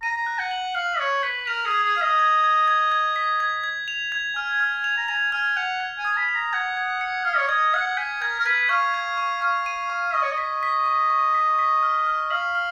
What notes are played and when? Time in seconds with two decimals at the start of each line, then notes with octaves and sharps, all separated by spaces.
0.03 A#5 D#7
0.26 F#6
0.39 F#5
0.51 F#7
0.75 F5 F#7
0.99 C#5 F#7
1.23 B4 B6
1.47 A#4 F7
1.66 G#4
1.71 G#6
1.83 G#4
1.95 F5 G#6
2.01 D#5
2.19 G#6
2.44 G#6
2.67 G#6
2.92 G#6
3.16 B6
3.40 G#6
3.64 G#6
3.88 F7
4.12 G#6
4.36 G#5 F6
4.60 F6
4.84 F7
4.97 A#5
5.08 G#5 F7
5.32 G#5 F6
5.57 F#5 F7
5.80 G#6
5.98 G#5
6.05 D#6
6.17 B5
6.29 F7
6.35 A#5
6.53 F#5 G#6
6.77 G#6
7.01 C#7
7.25 F5 F6
7.38 C#5
7.49 D#5 G#6
7.73 F#5 G#6
7.97 G#5 B6
8.21 A#4 G#6
8.39 A#4
8.46 B4 G#6
8.69 F5 C#6
8.94 G#6
9.17 C#6
9.42 F5 C#6
9.66 D#7
9.90 C#6
10.14 D#5 C#6
10.22 C#5
10.31 D#5
10.38 B6
10.63 B6
10.86 C#6
11.10 C#6
11.34 B6
11.59 B6
11.83 F6
12.07 F6
12.31 F5 F#7
12.55 F6